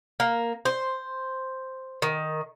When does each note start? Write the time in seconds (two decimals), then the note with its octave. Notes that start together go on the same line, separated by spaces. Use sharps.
0.20 A#3
0.65 C5
2.02 D#3